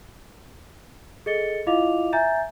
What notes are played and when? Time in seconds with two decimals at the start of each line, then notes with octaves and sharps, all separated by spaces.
1.26 G#4 A4 D#5 A6 C#7 G7
1.67 E4 F4 D#5 F5 D6 F7
2.13 E5 G#5 A#5 G6 A6